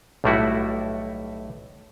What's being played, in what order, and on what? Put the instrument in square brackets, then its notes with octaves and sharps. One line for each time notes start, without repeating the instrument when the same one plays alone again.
[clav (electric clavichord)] B1 A2 G3 A3 E4 F#4